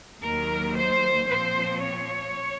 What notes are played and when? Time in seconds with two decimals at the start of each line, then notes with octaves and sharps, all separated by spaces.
0.22 D#2 D#3 F#3 A#4
0.75 C5
1.27 A#2 F3 C4 C5
1.79 C#5